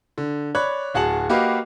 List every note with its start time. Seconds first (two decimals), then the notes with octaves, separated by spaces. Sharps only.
0.18 D3
0.55 C#5 D5 B5 F#6
0.94 D1 F#4 G#4 F#5 A5 F#7
1.29 A#3 F#4 G4 B4 D#5 F5